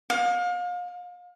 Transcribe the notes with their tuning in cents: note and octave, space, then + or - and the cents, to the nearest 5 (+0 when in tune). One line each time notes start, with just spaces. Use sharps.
F5 +35